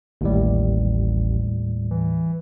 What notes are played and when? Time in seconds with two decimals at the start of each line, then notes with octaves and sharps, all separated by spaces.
0.21 A1 D#2 A2 G3
1.91 E3